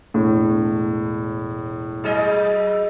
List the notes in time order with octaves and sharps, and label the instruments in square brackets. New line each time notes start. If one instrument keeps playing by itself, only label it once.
[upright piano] E1 A2
[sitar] F#3 G#4 D#5